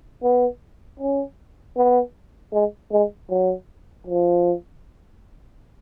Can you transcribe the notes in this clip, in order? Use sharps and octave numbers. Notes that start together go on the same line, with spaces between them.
B3
C#4
B3
G#3
G#3
F#3
F3